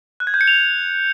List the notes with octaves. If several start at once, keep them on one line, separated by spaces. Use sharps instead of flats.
F#6
G#6
G6
C#7
F7